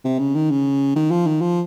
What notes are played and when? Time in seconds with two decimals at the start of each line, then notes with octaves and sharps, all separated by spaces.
0.04 C3
0.19 C#3
0.35 D#3
0.50 C#3
0.95 D#3
1.11 F3
1.26 D#3
1.41 F3